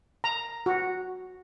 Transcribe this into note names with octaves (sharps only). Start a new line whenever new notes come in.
A#5
F#4